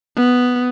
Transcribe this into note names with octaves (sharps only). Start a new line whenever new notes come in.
B3